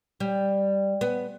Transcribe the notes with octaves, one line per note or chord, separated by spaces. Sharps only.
G3
B3